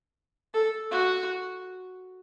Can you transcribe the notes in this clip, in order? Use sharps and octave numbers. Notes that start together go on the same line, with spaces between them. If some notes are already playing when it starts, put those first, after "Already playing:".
A4
F#4